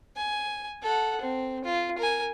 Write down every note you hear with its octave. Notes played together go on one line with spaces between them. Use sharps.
G#5
A4 F#5
C4
F4
A#4 G#5